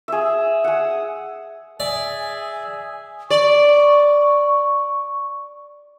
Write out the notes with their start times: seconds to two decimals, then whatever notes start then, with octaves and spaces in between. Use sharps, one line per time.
0.08 G#4 E5
0.64 G#4 F#5
1.80 G#4 D5 E5 G#5
3.31 D5 C#6